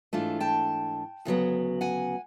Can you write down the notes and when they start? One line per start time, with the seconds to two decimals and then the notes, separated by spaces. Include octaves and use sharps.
0.13 G#2 E3 A3 D4 F4
0.40 G5 A5
1.25 D2 C#3 F#3 B3
1.81 F#5 G#5